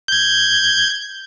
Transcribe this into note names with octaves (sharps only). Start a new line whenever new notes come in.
G6 G#6